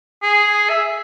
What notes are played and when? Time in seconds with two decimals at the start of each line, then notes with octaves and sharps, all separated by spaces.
0.23 G#4
0.70 E5